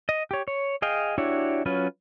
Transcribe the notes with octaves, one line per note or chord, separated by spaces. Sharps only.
D#5
G4 C#5
C#5
G#4 D#5 F5 G5
D4 E4 F#4 G4 C#5
F#3 C#4 F4 B4